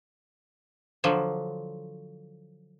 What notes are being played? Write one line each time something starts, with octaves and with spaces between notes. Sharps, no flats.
D3 F3 F#3